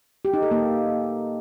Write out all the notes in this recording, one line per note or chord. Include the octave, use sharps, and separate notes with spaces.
G4
D#4
A4
A#3